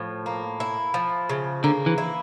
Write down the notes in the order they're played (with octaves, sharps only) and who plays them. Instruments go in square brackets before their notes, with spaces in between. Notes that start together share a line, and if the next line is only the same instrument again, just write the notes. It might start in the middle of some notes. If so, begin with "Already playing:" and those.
Already playing: [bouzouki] A2 F3
A#3
E4
F3
C#3
[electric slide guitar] D3 [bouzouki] A#3
[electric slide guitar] E3
[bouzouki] E4